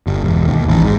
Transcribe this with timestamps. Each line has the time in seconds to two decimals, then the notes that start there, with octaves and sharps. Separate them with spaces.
0.07 G1
0.24 E1
0.48 D#2
0.68 A1
0.82 G#2